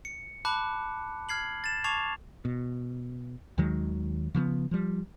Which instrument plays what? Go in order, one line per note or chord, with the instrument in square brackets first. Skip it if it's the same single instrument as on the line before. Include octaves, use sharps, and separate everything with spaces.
[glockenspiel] C#7
A5 B5 D6 F#6
F6 G#6 C7 F#7
A6 E7
A5 C#6 D6 G#6 C7 F7
[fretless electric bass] B2
D#2 D#3 F#3 G#3
C#3 F3 A#3 B3
F3 G3